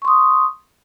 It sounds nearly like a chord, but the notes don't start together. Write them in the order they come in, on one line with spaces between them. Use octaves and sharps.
C#6 C6 D#6